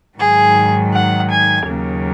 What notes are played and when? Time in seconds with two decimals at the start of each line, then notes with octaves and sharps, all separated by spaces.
0.18 G#2 D#3 F#3 G#4
0.93 F#5
1.30 G#5
1.67 D#2 C#3 F#3 A#3